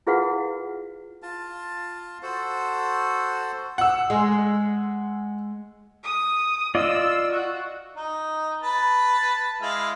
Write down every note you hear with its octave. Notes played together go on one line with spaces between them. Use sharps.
E4 F4 G#4 B4 F5 F#5
F4 A5
F#4 A4 C5
F#5 E6
G#3
D#6
F4 D5 D#5 E6
F#4
D#4
B4 A5
G#3 E4 F5